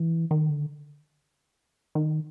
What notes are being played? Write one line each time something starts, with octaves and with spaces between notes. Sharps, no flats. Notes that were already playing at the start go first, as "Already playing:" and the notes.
Already playing: E3
D#3
D3
D#3